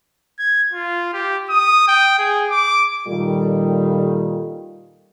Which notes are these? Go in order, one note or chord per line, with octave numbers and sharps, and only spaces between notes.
G#6
F4
G4
D#6
G5
G#4
D6
A#2 D#3 G3 F4 A4